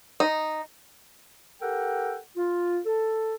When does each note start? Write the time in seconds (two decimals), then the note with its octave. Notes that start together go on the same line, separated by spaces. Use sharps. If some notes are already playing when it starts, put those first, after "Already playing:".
0.20 D#4
1.62 G4 A4 A#4 F#5 G5
2.37 F4
2.86 A4